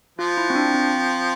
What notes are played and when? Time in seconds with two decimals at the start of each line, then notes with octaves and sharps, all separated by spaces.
0.19 F3 F4
0.37 E4
0.50 C4
0.55 D4
0.75 C4